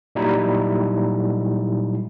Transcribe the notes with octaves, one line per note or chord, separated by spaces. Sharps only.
A#2 F#3 G3 D#4 E4